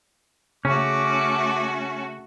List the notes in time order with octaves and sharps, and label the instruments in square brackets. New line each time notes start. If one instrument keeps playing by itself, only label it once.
[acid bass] C#3 [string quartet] A3 F#4 [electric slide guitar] C#4 [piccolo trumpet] D6